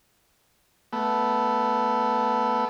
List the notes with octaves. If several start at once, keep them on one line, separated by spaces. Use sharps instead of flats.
A3 B3